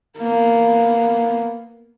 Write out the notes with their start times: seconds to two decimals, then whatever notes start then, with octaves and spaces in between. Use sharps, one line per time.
0.18 A#3 B3